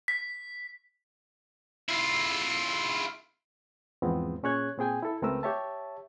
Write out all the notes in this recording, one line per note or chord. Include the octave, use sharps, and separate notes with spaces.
B6
E4 F4
E2 G#2 F3 G#3 B3 C4
A#2 C#4 G#4 C#5 F#6 G#6
A#2 C4 G#4 G5 G#5
E4 A4
C#2 A3 C4 A#4 B4 E6
G4 C#5 E5 A5